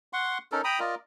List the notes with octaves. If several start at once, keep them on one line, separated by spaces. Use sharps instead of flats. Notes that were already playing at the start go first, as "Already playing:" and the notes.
F#5 C6 C#6
C#4 D#4 A4 A#4
G5 A#5 B5 D#6
F4 A#4 D5 D#5